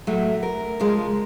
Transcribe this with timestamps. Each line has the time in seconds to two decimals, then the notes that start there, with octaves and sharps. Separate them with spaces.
0.07 A2 F#3 A3
0.43 A#4
0.80 C#3 F3 G#3